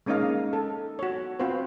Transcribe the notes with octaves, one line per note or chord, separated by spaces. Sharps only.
G#3 A#3 C#4 D#4 D#5 F5
A4
F#4 C#5
C4 F4 F#4 B4 C5